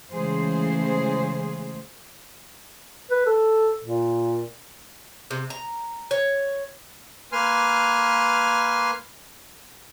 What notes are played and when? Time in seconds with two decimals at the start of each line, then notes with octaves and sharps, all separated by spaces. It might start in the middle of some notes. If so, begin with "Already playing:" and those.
0.12 C#3 E3 G#3 A3 G#4 C5
3.11 B4
3.26 A4
3.84 A#2
5.31 C3
5.50 A#5
6.11 C#5
7.32 A#3 B4 G#5 C6 F6